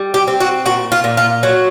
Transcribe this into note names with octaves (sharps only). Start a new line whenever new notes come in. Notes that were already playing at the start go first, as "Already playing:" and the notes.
Already playing: G3
G4
C4
F#4
A#2 F#4
F4
A#2
F4
F#3 F#4